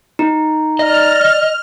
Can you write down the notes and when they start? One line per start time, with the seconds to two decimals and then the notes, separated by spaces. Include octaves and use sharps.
0.19 D#4
0.79 D5 D#5 F6